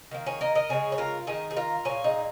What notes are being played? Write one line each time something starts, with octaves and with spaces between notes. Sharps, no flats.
D#3 A#3
G#4 C#5
A#4 D#5
A#4 D#5
C#3 G#3 G#4 C#5
C#5
F4 A#4
D#3 A#3 D#4 G#4
G#4
F4 A#4
A#2 A#3 G#4 C#5
D#4 G#4